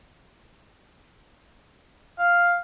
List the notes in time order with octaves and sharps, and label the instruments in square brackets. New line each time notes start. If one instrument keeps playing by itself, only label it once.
[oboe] F5